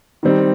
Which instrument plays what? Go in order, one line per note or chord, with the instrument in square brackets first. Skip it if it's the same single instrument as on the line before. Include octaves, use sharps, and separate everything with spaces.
[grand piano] D#3 G3 C4 D#4